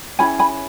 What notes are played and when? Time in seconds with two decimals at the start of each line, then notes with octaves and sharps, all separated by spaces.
0.19 C#4 E4 G#4 G#5 B5
0.39 G#5 B5